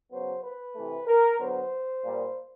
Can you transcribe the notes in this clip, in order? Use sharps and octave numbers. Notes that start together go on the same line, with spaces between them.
C#3 F#3 B3 C5
B4
C3 E3 A3
A#4
D3 F#3 B3 C5
A#2 G3 A#3